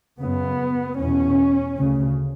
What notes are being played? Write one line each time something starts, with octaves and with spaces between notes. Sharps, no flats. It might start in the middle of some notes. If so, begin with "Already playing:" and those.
F#2 C#3 B3
E2 B2 C#4
D2 C#3